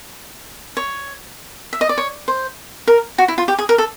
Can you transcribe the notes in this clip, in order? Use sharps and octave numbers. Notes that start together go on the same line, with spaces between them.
C#5
E5
D#5
D5
C#5
C5
A#4
F#4
E4
F4
G4
G#4
A#4
A4